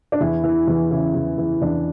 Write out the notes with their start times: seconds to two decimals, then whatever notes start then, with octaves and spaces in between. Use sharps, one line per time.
0.12 D4
0.20 E2 E4
0.44 E3
0.67 E2
0.91 C#3 E4
1.14 E2
1.38 E3
1.61 E2 D4